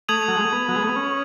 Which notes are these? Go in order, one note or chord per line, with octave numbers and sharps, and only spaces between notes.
A3 D#6 G#6 D#7 F#7
F#3
G#3
A3
B3
F#3
G#3
A3
B3
C#4